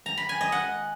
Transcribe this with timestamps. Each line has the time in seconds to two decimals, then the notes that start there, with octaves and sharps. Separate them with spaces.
0.06 A#5
0.17 B5
0.29 G#5
0.41 D#5
0.52 F#5